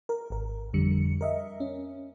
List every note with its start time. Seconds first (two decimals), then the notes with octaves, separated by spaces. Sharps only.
0.09 A#4
0.30 G#1 A#4
0.73 F2 D3 G3 C#7
1.21 A#4 D#5 E5
1.60 C#4